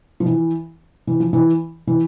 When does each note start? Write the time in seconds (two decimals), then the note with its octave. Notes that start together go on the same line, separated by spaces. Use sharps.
0.20 F3
0.26 E3
1.07 E3
1.20 F3
1.33 E3
1.87 E3